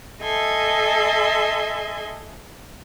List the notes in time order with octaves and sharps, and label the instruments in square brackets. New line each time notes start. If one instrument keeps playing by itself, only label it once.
[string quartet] A4 D#5 E5 G#5 C6